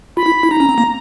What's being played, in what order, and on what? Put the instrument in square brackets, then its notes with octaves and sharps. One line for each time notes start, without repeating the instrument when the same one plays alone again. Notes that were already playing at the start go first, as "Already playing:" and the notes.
[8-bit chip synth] F4 [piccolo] B5
[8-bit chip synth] E4
E4
[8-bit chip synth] D#4 [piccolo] A#5
[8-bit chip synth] C#4
C4
A#3